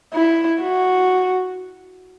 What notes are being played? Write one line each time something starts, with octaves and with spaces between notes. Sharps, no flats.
E4
F#4